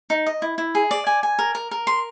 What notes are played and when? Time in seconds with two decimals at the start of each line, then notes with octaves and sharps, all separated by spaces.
0.10 D#4
0.26 D#5
0.42 E4
0.58 E4
0.75 G#4
0.91 D5
1.07 G#5
1.23 G#5
1.39 A#4
1.55 A#4
1.71 A#4
1.87 C6